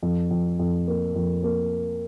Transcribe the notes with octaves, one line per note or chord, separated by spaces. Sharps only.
F2
F2
F2
A#3
F2
A#3